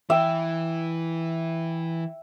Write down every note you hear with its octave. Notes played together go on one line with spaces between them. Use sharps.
E3 E5 G5